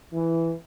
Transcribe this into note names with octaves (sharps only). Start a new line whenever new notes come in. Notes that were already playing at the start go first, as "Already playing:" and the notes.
E3